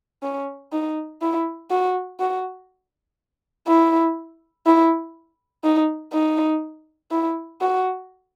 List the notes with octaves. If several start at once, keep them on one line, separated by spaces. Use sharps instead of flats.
C#4
D#4
E4
F#4
F#4
E4
E4
D#4
D#4
E4
F#4